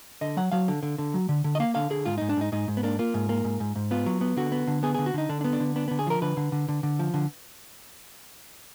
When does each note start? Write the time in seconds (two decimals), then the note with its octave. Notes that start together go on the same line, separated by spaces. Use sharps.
0.21 D3 D#5
0.37 F#3 F#5
0.52 F#3 F5
0.68 D3
0.83 D3
0.98 D3
1.14 F#3
1.29 D3
1.44 D3
1.55 D#5
1.60 A#3 F5
1.75 D3 F5
1.90 D3 G#4
2.06 G#2 F4
2.18 G#2 D#4
2.29 D4
2.37 G#2 D#4
2.52 G#2 D#4
2.68 G#2
2.77 B3
2.83 A#3 D4
2.99 A#3 F4
3.14 G#2
3.29 A#3
3.44 G#2
3.60 G#2
3.76 G#2
3.91 B3 F4
4.06 F#3
4.21 B3
4.37 D3 F#4
4.52 B3
4.67 D3
4.83 B3 G#4
4.95 D3 G#4
5.06 F#4
5.14 D3 D#4
5.29 D3 D4
5.41 D4
5.44 B3
5.53 D4
5.60 D3
5.76 B3 D4
5.88 D3 B3
5.99 G#4
6.07 F3 A#4
6.22 D3 B4
6.37 D3
6.52 D3
6.68 D3
6.83 D3
6.99 F3
7.14 D3